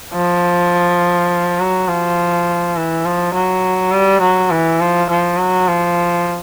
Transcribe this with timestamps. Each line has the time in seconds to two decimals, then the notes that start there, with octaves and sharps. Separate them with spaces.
0.14 F3
1.60 F#3
1.89 F3
2.76 E3
3.05 F3
3.34 F#3
3.92 G3
4.21 F#3
4.51 E3
4.80 F3
5.10 F3
5.38 F#3
5.67 F3